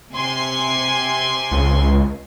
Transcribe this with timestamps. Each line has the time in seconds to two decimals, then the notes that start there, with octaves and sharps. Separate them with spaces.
0.13 C3 G#5 C6
1.51 C#2